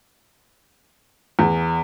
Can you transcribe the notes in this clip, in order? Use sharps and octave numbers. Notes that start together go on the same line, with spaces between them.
E2